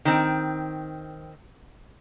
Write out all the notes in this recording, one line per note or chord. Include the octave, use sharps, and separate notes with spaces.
D#3 C4